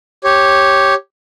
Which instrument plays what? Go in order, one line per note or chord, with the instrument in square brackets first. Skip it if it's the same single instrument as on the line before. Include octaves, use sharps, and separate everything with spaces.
[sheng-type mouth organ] G4 C#5